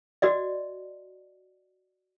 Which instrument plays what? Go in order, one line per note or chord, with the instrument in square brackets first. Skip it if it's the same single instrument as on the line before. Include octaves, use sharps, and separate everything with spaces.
[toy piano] F#4 D5 D#5